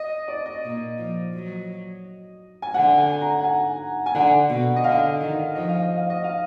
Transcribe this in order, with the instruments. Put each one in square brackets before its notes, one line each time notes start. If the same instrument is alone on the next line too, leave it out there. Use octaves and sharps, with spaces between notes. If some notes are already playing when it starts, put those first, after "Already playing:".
Already playing: [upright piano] D#5
D5
D#5
[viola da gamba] A#2
F3
F#3
[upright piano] G#5
[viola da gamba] D3 [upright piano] F#5
[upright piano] G#5
A#5
F#5
G#5
G#5
[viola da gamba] D3 [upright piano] F#5
[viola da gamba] B2
[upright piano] D#5
[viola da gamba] D3 [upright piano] F5
[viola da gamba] D#3
[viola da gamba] F3 [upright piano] D#5
[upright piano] F5
D#5
F5
D#5
F5